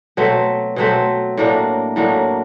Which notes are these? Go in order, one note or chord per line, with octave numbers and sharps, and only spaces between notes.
B2 F#3 A3 C4
B2 F#3 A3 C4
A2 F#3 A#3 D4
A2 F#3 A#3 D4